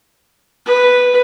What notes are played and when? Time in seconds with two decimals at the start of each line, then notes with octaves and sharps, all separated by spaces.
0.66 B4